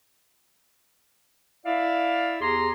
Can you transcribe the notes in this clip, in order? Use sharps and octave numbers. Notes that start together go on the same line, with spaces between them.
E4 D5 E5 F5
E2 G4 G#4 A#5 C6